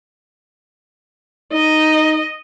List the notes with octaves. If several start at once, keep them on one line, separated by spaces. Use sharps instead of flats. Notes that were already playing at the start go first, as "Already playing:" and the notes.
D#4 D#5